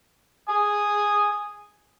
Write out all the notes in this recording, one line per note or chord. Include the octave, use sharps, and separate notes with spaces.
G#5 D#6